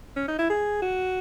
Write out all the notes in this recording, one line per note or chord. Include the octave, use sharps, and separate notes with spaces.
C#4
D#4
E4
G#4
F#4